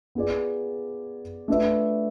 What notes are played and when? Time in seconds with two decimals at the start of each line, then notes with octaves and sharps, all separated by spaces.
0.15 B3 F4 G#4 D5
1.48 A3 D4 F4 B4 E5